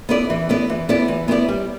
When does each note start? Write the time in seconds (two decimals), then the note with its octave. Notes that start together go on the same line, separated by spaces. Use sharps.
0.09 B3 E4 B4 D5
0.30 E3
0.49 B3 E4 B4 D5
0.70 E3
0.89 B3 E4 B4 D5
1.08 E3
1.28 B3 E4 B4 D5
1.48 G3